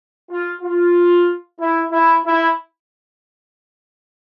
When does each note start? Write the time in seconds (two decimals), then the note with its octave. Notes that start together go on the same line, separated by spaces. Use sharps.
0.30 F4
0.62 F4
1.59 E4
1.91 E4
2.24 E4